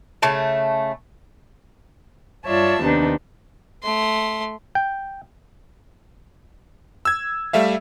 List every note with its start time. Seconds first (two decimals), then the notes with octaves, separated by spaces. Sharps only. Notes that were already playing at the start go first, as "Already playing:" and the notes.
0.22 C#3 A3 A5
2.45 G2 F4 C#5 D5 E5 A5
2.81 D#2 C3 B3 D4 D#4
3.83 A3 C6
4.75 G5
7.05 E6 G#6
7.53 G3 A3 E5 F5